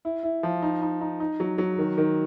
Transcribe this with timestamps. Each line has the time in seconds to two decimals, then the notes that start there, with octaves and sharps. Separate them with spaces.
0.05 E4
0.23 E4
0.43 F3
0.62 D#4
0.82 D#4
1.01 D#4
1.20 D#4
1.40 F#3
1.58 F#3
1.78 D#3
1.98 D#3